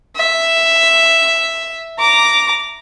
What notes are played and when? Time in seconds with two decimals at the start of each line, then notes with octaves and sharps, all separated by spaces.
0.16 E5
1.99 A#5 D6